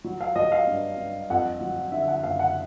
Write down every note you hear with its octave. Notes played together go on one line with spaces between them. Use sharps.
F#3
F5
F#3 D#5
F5
G2
G2
F2 F#5
F#3
D3 E5
F#5
F#1 F5
F#5